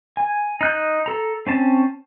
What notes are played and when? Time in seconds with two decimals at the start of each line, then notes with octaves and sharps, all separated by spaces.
0.17 G#5
0.61 D#4 F#6 G6
1.06 A4 A#5
1.47 C4 C#4 A5